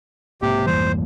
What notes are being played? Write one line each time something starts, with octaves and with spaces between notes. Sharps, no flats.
B1 G#2 C3 A#3 G4
F2 E3 G3 C5